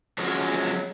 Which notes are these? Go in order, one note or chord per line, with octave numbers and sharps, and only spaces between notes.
F3 F#3 G#3 C#4 F#4